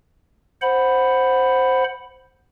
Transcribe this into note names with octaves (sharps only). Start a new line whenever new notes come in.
C5 F#5 B5